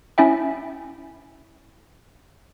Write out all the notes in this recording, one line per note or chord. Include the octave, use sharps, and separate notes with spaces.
C#4 E4 E5 G5